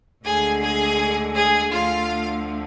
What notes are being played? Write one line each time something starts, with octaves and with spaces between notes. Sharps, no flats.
D2 D3 G#3 G#4 G#5
G#4 G#5
G#4 G#5
D2 D3 F3 A3 F4 F5